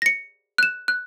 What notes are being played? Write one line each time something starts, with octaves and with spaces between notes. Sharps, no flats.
A#6 C#7
F#6 E7
F#6